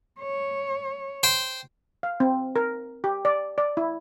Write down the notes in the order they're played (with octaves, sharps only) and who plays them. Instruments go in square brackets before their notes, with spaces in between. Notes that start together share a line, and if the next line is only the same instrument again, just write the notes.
[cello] C#5
[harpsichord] C5 G5
[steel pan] F5
C4
A#4
G4
D5
D5
E4